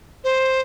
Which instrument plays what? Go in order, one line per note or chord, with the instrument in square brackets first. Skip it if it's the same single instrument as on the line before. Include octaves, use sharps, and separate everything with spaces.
[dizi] C5